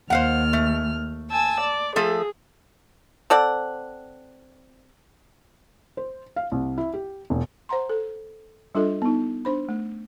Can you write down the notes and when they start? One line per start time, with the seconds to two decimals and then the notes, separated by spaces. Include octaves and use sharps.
0.10 D#2 C5 F5 F#5 F6
0.53 A3
1.31 G#5 A5 E6
1.61 D5
1.96 F3 A3 G#4 A4
3.30 C4 A4 D5 F#5
5.97 C5
6.36 F5
6.52 C2
6.78 E4
6.94 G4
7.30 E1
7.69 C5 F#5 A#5 C6
7.89 A4
8.75 G3 D4 F4 A4 D#5
9.02 B3 D#4
9.45 D4 C5 B5
9.69 A3